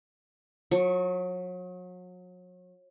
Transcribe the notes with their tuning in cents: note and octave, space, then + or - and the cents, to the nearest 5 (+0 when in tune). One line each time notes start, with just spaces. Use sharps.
F#3 -35 C#6 +0